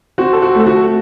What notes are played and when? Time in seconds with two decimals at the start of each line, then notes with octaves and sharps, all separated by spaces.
0.18 C4 F#4
0.33 A4
0.42 F#4
0.55 A3 A4
0.67 F#4